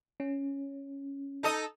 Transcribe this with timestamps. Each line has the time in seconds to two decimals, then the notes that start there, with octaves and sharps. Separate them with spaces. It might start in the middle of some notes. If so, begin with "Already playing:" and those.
0.20 C#4
1.43 D#4 A4 D#5